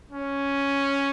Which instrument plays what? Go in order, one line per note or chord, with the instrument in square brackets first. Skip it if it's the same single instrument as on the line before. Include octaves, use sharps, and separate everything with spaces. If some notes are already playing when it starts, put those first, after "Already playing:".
[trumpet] C#4